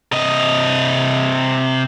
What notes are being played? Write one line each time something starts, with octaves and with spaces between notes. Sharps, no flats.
C3 D#5